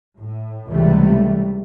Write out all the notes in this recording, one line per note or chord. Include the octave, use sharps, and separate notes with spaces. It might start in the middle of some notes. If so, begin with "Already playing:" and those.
A2
C#2 C3 E3 G3 A3